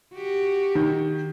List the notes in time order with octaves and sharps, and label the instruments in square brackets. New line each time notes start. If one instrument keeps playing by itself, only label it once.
[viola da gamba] F#4 G4
[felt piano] D#3